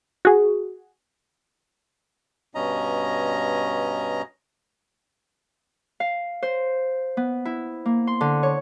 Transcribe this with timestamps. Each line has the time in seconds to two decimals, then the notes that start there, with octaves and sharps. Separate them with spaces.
0.25 F#4 G#4
2.55 G2 B2 C#4 D#5 A#5
6.00 F5
6.43 C5
7.17 B3
7.45 E4
7.86 A#3
8.07 C6
8.21 D3
8.43 C#5